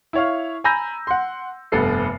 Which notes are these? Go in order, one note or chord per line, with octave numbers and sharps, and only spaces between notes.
E4 C#5 F5
G#5 A#5 B5 E6 G6 A#6
F#5 C6
F1 G2 B3 A4 C7